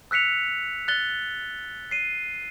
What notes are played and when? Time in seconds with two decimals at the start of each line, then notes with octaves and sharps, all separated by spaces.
0.11 E6 F#6 B6 C#7 F7
0.88 F#6 A6 G7
1.91 C7 D#7